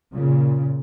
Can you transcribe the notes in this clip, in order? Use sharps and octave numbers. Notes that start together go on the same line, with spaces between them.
A#2 C#3